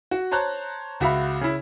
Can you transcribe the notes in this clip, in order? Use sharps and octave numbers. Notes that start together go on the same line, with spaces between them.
F#4
C5 C#5 A5 A#5 F#6
C#2 F#4 E5 F5 B5
C#3 E4